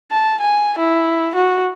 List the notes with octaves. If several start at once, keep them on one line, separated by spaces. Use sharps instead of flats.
A5
G#5
E4
F#4